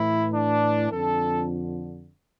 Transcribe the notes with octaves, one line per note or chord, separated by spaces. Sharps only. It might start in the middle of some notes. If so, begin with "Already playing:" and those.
Already playing: A2 E3 E4
D4
F2 D3 A4